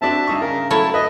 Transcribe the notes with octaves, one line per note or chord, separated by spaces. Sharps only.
C4 D4 F#4 E5 A5
G2 D#4 C#6
C#3 A#4
F#3 A3 E4 C#5 A5
B4 D#5 E5